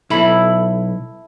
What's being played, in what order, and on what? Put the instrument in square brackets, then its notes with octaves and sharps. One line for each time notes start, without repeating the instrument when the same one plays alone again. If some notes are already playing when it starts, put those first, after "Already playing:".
[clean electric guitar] B1 B5 [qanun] E4 A4